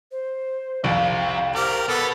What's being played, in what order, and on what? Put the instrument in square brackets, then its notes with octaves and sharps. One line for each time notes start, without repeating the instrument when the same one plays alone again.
[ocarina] C5
[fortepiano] C2 F2 [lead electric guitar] C3 [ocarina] F5
[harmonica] G4 A#4 [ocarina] C5 [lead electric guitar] D5
[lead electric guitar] B2 [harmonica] B3 A4 [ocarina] E6